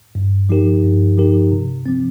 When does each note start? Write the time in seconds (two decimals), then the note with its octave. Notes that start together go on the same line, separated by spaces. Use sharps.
0.15 G2
0.49 F3 D#4 G4 A#4
0.83 G2
1.17 F3 D#4 G4 A#4
1.52 C3
1.86 F3 C4